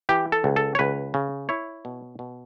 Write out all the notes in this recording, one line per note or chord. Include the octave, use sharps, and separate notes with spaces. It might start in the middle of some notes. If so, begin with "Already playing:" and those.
E3 G4
A4
C#2
A4
C#5
C#2 B4
C#3
E4 C#5
B2
B2